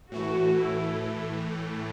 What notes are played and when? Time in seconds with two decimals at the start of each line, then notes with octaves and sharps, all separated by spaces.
0.11 A2 E3 A3 F#4
0.59 E4